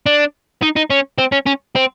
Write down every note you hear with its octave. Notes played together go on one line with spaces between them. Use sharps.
D4
D#4
D#4
C#4
C4
C#4
C#4
C4